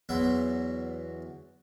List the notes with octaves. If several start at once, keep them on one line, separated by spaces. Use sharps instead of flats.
E2 B2 F#3 E4 C6